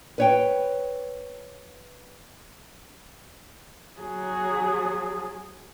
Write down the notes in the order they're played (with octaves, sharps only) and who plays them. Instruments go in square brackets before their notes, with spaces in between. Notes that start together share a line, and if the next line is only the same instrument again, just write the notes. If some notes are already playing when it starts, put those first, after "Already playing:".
[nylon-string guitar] B4 C#5 G5
[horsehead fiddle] F#3 G#4